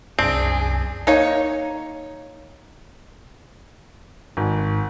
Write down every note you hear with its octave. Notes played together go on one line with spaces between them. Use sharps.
C2 F#2 C4 D4 G#4
A#3 D#4 C#5
G#1